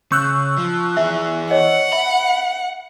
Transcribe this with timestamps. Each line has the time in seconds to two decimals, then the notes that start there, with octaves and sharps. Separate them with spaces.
0.12 C#3 C#6 E6 F#6 G6
0.58 F3
0.97 E3 G#4 E5
1.51 C#5 D#5 F#5
1.92 E5 B5